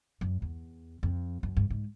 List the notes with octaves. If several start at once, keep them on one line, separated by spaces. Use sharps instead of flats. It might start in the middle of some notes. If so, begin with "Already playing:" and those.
F#2
E2
F2
F#2
G2
G#2